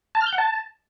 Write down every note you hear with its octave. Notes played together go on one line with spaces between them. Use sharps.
A5
F6
G6
F#5
A5